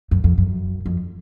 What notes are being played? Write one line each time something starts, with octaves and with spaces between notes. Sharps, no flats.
F#2
F2
F#2
F2